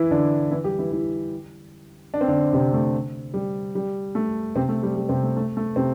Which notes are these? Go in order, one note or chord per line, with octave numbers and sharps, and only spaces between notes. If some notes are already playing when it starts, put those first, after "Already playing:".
Already playing: E3 E4
D3 D4
E3 E4
G3 G4
E3 E4
E3 E4
D4
C4
D3 D4
C3 C4
A3
G3
G3
A3
C3 C4
A3
G3
G3
C3 C4
A3
A3
A3
C3 C4